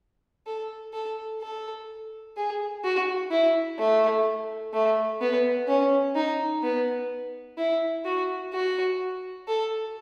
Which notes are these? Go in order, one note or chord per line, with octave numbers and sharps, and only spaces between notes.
A4
A4
A4
G#4
F#4
E4
A3
A3
B3
C#4
D#4
B3
E4
F#4
F#4
A4